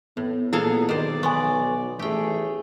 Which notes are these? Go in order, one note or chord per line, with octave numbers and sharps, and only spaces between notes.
A2 B3
A#2 B3 E4 G#4 A4 F5
B1 D#3 C5 D5
B3 G#5 C6 C#6
A1 A3 G4 G#4 G5